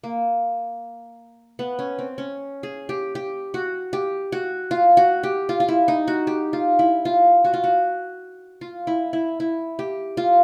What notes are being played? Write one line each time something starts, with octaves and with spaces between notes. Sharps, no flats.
A#3
B3
C#4
C4
C#4
G#4
G4
G4
F#4
G4
F#4
F4
F#4
G4
F4
F4
E4
D#4
F#4
G4
F4
E4
F4
F#4
F4
F#4
F4
E4
E4
E4
G4
F4